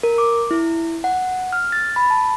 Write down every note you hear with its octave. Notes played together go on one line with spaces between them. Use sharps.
A#4
D6
E4
F#5
F6
A6
B5
A5